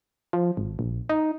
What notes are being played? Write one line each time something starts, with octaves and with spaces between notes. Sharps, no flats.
F3
G#1
A#1
D#4